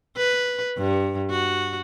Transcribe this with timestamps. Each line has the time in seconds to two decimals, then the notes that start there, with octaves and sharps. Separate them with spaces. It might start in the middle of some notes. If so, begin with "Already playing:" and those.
0.17 B4
0.77 G2
1.30 F#4